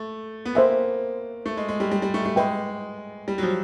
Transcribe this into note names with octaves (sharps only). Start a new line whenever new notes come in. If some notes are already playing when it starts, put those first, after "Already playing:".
Already playing: A3
B3
A#3 C5 E5 G#5
A3
G#3
G#3
G3
G3
G3
A3
A3
G#3 B4 E5 G5
G3
F#3
F3